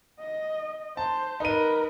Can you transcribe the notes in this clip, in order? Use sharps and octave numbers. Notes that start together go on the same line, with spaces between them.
D#5
C5 A5
D#4 A#4 B4 D#7